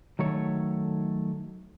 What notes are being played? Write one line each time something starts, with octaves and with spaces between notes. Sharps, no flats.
D#3 F#3 A3 C#5